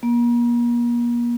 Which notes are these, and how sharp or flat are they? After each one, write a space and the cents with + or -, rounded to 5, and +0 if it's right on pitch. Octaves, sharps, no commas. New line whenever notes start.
A#3 +40